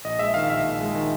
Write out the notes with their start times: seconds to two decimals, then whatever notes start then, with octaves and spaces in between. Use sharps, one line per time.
0.05 A#1 D#5
0.19 G#3 E5
0.34 D#3 F5
0.50 A#1 E5
0.64 A#1
0.80 G#3
0.95 D#3